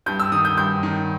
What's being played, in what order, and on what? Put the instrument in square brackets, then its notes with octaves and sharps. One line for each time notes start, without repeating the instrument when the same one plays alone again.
[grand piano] G2 G6
E6
D#3 D#6
G6
G2 G6
D#3